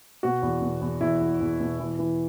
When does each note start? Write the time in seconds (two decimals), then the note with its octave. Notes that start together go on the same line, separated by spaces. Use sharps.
0.23 B2 F#4
0.42 E2
0.62 B2
0.81 E2
1.01 E2 E4
1.21 E2
1.41 E2
1.60 B2
1.80 E3
1.99 E3